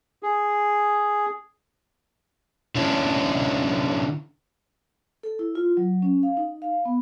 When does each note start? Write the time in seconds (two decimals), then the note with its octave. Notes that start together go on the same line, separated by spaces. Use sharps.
0.23 G#4
2.75 D3 C#4 D4 E4
5.23 A4
5.39 E4
5.55 F4
5.77 F#3
6.02 C#4
6.23 F5
6.37 D#4
6.62 F5
6.85 B3